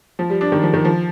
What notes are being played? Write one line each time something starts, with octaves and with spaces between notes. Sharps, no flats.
F3
G3
D4
D#3
F3
D#3
F3